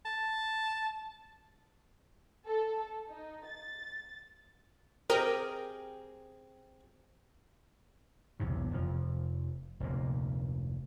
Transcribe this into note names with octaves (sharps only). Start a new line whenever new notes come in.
A5
A4
D#4
A6
C4 G4 G#4 A#4 D#5 G5
B1 E2 G2 C3
F1 F2 F3
F1 D2 A#2